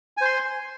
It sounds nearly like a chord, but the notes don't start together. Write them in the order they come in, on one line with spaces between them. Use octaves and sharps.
G#5 C5 C6